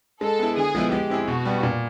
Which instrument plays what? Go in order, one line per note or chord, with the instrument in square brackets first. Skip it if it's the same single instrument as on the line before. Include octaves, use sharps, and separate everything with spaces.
[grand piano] G#3 [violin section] A4
[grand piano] B3 E4
[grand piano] D3 [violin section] G#4
[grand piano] F3 G#3 B3 E4
[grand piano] G#3 [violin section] G4
[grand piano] C4 E4 G#4
[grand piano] B2 [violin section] F#4
[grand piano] G3 B3
A#2